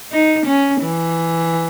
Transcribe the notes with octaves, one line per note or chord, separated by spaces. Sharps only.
D#4
C#4
E3